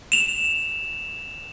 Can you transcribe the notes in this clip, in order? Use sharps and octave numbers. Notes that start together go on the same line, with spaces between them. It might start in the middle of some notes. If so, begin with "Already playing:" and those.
E7 F7